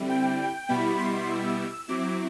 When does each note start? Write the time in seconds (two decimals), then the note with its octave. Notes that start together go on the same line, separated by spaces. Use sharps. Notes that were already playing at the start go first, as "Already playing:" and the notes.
Already playing: D3 G3 C4 E4
0.09 G5
0.69 B2 G3 B3 E4 B5
0.99 C6
1.29 E6
1.88 F#3 C4 E4 D6